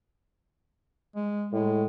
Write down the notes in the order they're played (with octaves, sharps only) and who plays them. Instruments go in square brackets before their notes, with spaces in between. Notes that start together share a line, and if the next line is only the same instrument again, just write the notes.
[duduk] G#3
[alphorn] A2 [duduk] G#3